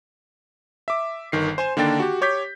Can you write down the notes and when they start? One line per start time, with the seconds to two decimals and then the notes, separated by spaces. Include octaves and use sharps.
0.88 E5 D6
1.32 G1 D#3 C7
1.58 C5 G#5 C6 E7
1.77 D3 D#3 A#3 D4 G5 A6
2.00 F#4 G4
2.21 G4 C#5 D6 G6 B6